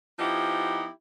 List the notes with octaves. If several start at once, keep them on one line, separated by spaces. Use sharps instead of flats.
F3 B3 D#4 E4 G4